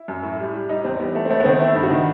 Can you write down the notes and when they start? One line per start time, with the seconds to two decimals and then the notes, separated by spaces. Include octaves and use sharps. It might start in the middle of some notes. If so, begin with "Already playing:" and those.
Already playing: E4
0.08 F#2
0.23 A2
0.40 G3
0.54 G3
0.69 G3 D#4
0.84 E2 C4
0.99 G3 B3
1.15 A3
1.25 C4
1.30 A3 B3
1.40 B3
1.45 D#3 C4
1.60 A3 E4
1.75 G2
1.83 F#4
1.90 D#3